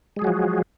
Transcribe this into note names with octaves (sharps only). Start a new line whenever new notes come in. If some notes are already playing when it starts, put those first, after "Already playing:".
F3 F#3 G#3 F#4 G#4